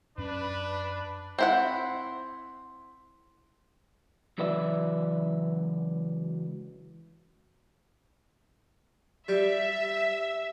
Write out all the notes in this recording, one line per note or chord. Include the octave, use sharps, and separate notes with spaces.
F#2 C#4 D4 B4
C4 E4 F#5
C#2 E3 F#3 B4 D5 E5
G3 E5